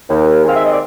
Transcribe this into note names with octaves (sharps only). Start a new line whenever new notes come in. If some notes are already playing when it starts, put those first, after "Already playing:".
D#2
D#3 G#3 C4 F5
E5
D#5
D5